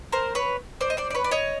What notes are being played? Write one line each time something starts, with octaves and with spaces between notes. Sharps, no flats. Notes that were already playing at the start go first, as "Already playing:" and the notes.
A#4 C5
B4 C#5
C5 D5
D#5
C5 D5
D5
B4 C#5
D5
C#5 D#5